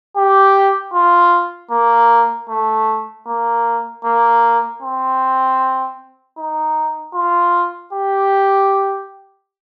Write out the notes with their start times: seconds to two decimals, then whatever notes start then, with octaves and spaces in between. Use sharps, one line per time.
0.17 G4
0.94 F4
1.71 A#3
2.49 A3
3.27 A#3
4.04 A#3
4.82 C4
6.38 D#4
7.15 F4
7.93 G4